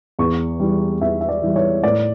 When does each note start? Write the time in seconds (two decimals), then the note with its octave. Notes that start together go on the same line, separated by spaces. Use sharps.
0.19 E2 C#6
0.60 E3 G3
1.01 E2 E5
1.21 E5
1.29 D5
1.42 E3 G3
1.56 C#5
1.83 A2 D5